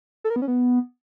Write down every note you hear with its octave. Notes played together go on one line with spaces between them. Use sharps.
A4
A#4
B3
C#4
B3